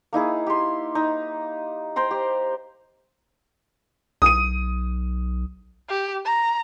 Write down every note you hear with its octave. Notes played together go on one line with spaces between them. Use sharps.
A#3 D#4 E4 G#4
G4 C6
D#4
C5 G5 A#5 C6
G4
B1 D#6 D#7
G4
A#5